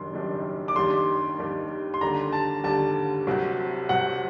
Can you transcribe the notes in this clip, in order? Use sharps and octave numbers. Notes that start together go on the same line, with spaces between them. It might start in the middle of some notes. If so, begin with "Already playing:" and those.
Already playing: F#1 F#2 D#3 G3 D4 C6
F#1 F#2 D#3 G3 D4
D6
D#2 D#3 G3 D4 G4 C6
D#2 D#3 G3 D4 G4
C6
D#2 D3 G3 D4 A#5
A5
D#2 D3 G3 D4 A5
C2 C3 F#3 C4 F#4
C2 C3 F#3 C4 F#4 F#5